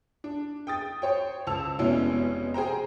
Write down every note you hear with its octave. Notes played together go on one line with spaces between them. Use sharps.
D4
G5 D#6 A6
C5 C#5 G5
C#2 A5 E6 F7
F1 B2 G#3 C#4 E4
G#4 C5 G5 A#5